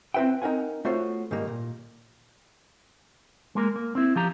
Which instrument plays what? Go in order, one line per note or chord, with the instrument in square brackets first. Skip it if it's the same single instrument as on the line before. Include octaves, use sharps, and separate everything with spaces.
[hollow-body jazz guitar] C4 E4 B4 E5 G5
C4 D#4 A#4 F#5 G#5
A3 B3 F4 F#4 C5 C#5
G#2 D#3 G3 A#3
A#2
[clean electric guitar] G#3 A#3 A#4
A#3
C4 E4
F3 G4 A#5